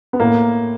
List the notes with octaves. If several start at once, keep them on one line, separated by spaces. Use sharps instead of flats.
B3
A2 A#3